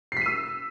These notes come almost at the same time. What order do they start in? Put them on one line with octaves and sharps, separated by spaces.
C7 B6 D#7 E6